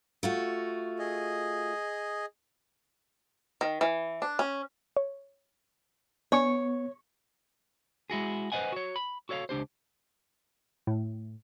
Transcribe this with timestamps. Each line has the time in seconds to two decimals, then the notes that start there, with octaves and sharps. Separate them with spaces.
0.23 A3 F4 F#4
0.99 G#4 D#5
3.61 D#3
3.81 E3
4.22 D4
4.39 C#4
4.97 C#5
6.32 B3 D4 C#5 G#5 C#6
8.10 G#3 E4 F#4 G#4
8.52 B4 C5 D5 D#5 F#5 G#5
8.72 F#4 C#5
8.96 B5
9.29 F#4 A4 C#5 D#5 F5
9.49 C#2 D4 G4 C5
10.87 A2